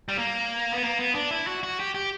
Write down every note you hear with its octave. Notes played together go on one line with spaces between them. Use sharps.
G3
A#3
B3
A#3
B3
D4
E4
F#4
F#4
G4
G4